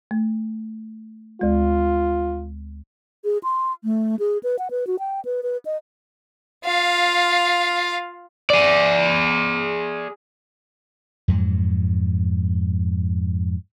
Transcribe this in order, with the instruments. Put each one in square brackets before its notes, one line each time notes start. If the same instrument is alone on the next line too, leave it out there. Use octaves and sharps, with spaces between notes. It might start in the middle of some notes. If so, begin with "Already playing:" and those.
[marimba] A3
[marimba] D2 G#3 [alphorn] F4
[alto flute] G#4
C6
A3
G#4
B4
F#5
B4
F#4
G5
B4
B4
D#5
[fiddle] F4 F5
[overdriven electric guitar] G#4 D5
[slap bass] F2 G#2 F#3